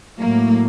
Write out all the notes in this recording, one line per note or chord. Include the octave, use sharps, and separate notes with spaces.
A2 F#3 A#3